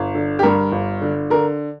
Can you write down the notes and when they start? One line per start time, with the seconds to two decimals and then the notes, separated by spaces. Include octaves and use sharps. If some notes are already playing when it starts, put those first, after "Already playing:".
Already playing: G1
0.15 D3
0.39 G4
0.43 G2 A#4
0.72 G1
1.02 D3
1.30 D3 A#4